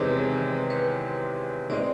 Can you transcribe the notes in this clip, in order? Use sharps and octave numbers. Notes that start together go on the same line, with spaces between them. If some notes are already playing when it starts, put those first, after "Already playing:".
Already playing: E2 C3 D#3 G#3 C4 B4 C#5
B4 C#5
G#3 C4 D#4 C5 D5